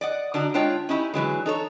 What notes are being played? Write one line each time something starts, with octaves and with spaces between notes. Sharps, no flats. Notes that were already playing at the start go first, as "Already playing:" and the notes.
D5 D#5 F#5
D3 D4 D#4 F#4
G#3 D4 F4 C#5 G5
C#4 D#4 E4 G4
D3 E3 F#3 G#3
D#4 A4 C#5